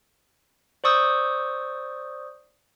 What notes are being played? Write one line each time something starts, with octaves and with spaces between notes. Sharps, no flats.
C5 D5 C#6 D#6 E6 G6